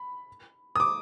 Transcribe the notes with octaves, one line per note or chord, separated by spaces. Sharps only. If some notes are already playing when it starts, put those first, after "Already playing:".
Already playing: B5
D#6
D6